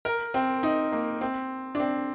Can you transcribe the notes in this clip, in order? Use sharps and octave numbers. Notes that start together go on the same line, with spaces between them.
A#4
C4
D#4
A#3
C4
D4
C4